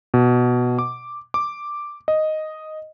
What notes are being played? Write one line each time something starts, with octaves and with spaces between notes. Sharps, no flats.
B2
D6
D6
D#5